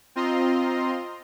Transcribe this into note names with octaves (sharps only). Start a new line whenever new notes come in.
C4 F4 D#5 A#5 C6